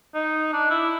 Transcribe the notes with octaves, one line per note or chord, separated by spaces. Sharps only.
D#4
D4
E4